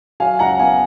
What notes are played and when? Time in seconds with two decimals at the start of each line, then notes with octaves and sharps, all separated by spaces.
0.20 F#3 F5 G#5
0.39 C#2 F#5 A#5
0.59 B3 F5 G#5